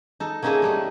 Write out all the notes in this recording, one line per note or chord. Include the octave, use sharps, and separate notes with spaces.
D#4 A4
A#3 C#4 D#4 E4 G#4 A4
G3 A3 D#4